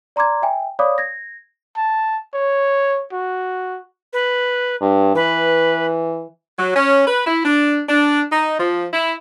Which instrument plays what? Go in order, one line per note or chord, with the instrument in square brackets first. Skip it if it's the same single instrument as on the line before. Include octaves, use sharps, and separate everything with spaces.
[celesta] D5 A#5 C6 D6 G#6
E5 G5 G#5
C#5 D5 F5 B5 D6 D#6
G#6 A#6
[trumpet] A5
C#5
F#4
[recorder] B4
[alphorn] G2
[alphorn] E3 [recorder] B4
[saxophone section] F#3
C#4
B4
E4
D4
D4
D#4
F3
E4